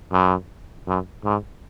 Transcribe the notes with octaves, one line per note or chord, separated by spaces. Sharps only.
F#2
F#2
G#2